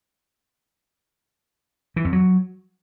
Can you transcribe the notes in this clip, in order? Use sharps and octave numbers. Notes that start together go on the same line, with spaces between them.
E3
F2
F#3